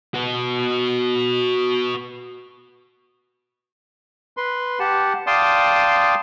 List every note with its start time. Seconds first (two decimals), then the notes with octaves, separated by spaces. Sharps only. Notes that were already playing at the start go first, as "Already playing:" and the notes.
0.14 F#4 B4
4.37 B4 C6
4.79 G4 F#5 A5
5.27 D5 F5 G5 A5 C6 D#6